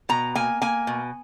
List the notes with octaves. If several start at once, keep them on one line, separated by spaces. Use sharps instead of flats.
B2 A#5
A#3 G#5
A#3 G#5
B2